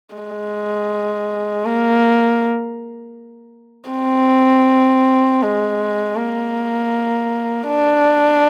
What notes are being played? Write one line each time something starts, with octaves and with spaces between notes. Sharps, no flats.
G#3
A#3
C4
G#3
A#3
D4